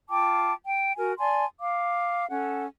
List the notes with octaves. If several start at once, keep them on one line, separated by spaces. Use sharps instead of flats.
F4 G5 A5 D6
G5
F#4 A#4 G#5
D5 G#5 A5 C6
F5 D6
C#4 A4 F#5